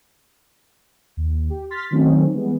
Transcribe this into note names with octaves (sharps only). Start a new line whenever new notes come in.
D#2
G4
C6 F6 A6 B6
D#3 F#3 A3 C4 C#4 D#4
E3 G3 G#3 B3